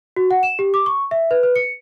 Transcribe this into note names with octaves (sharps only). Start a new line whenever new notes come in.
F#4
F#5
E7
G4
D6
C#6
E5
B4
B4
C#7